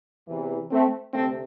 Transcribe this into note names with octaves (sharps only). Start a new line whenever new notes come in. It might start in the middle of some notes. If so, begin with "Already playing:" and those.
E2 C3 E3
A3 C4
D2 C3 A3 C4